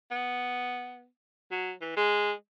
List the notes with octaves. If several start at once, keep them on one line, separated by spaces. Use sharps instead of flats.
B3
F#3
E3
G#3